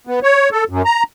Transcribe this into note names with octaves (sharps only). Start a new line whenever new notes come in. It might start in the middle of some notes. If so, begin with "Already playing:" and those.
B3
C#5
A4
F#2
A#5